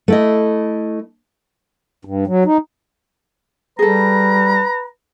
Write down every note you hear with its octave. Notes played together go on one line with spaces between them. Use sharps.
A3 E4 D#5
G2
F#3
D#4
G3 G#4 A4 B4 A#5